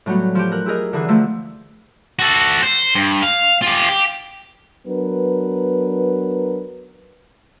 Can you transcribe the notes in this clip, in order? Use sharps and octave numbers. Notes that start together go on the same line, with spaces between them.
A2 F#3 G3 B3 F#4
F3 G4
A#4 F#6
E4 G4 G#4 A#4 D#5
D3 E3 G#4
D3 F3 A3
F#4 A4
C5
G2
F5
F4 G4
G4
F#3 B3 D4 A#4 B4